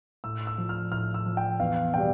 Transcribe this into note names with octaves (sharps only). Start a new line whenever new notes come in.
A2 E6
E6
F3
F6
A2 F6
E6
F3
G5
E2 F5
B2 G3 G5